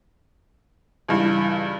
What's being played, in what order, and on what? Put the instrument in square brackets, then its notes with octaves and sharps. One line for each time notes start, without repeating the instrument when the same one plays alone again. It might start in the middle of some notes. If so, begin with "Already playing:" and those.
[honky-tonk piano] C#2 G2 E3